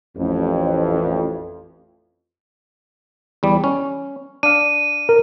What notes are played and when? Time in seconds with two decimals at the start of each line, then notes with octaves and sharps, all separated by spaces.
0.17 A1 F2
3.43 E2 G3
3.64 C#4
4.43 D4 F5 D#7
5.09 A#4